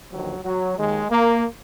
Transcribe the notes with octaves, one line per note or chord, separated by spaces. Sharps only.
D#2 D3 F3 F#3
F#3
D#2 D#3 G#3
A#3